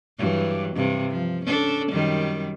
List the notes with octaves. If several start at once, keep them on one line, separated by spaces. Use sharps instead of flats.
G2 E3 F#3
G2 C3
F3
C#4 D4 A4
F#2 D#3 G3